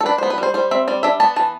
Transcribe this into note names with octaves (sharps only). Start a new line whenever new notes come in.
A4
D4 B4
C5
B3
B4
G3 C5
G3 C5
C4 E5
G3 D5
D4 E5
B3 A5
E3 A5